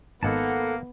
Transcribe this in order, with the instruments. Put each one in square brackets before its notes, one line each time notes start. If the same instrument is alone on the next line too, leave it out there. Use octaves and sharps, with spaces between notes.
[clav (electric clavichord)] G#1 D#4 [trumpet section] A#3 [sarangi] B3 [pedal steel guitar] A4 F#5 A5